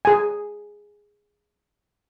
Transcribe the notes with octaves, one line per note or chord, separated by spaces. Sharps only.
G#4 G#5